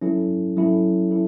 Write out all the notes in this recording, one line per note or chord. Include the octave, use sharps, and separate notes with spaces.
F#3 C#4 E4 A4
F#3 C#4 E4 A4
E4 A4